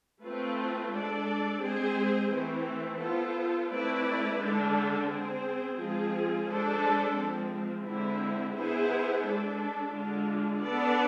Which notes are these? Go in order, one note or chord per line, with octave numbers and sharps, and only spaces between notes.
A3 C4 F4 B4
G#3 D4 A4 D5
G#3 C4 G#4 C5
E3 A3 C4
B3 F4 A4 C5
A3 C4 E4 B4 D5
D3 G#3 D4 A4
C4 G#4 C5
F3 G#3 C4 F4 G#4
G#3 D4 A4 C5
F3 G#3 C4
D3 G#3 C4 E4
B3 E4 G#4 C5
G#3 D4 A4
D3 G#3 D4 F4
B3 D4 A4 D5